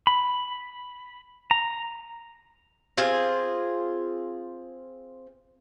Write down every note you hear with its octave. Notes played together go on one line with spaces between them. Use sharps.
B5
A#5
C4 F4 G#4 G#5